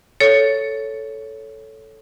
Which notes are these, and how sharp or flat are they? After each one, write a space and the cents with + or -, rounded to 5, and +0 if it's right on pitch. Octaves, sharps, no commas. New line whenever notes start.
A4 +0 C#5 +5